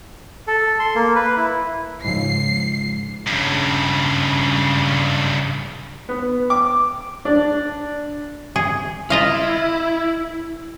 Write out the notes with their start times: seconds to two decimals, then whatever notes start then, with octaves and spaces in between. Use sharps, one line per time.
0.47 A4
0.80 C6
0.95 A#3
1.15 B4
1.37 E4
2.05 G#2 C#3 F3 C7
3.27 G2 C#3
6.09 B3
6.50 D6
7.25 D4
8.56 G#4
9.10 E4 F4 D#5 F5